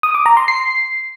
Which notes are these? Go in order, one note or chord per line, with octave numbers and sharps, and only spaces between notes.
D#6
D6
A#5
C6
C7